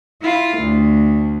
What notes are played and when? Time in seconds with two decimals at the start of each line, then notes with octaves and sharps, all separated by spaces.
0.22 E4 F4
0.57 D2